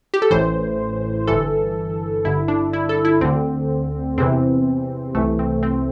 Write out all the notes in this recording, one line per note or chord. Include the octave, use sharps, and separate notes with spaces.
G4
A4
A1 A2 E3 C5
G1 G2 E3 A4
G1 G2 D3 E4
D4
E4
A4
E4
D2 D3 C4
E2 C3 E3 C4
C2 C3 E3 A3
C4
C4